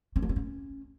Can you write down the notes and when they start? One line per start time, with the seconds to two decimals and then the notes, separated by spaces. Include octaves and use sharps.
0.16 C4
0.22 A#3
0.29 B3
0.36 C#4